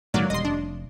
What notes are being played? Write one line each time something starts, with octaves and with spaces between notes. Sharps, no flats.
G#2 D3 E3 F#3 A#3 D5
D#1 G3 D#5 C6
F1 D4